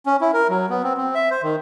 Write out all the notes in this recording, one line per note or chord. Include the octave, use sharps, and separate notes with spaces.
C#4
E4
A#4
F#3
B3
C4
C4
E5
C5
D#3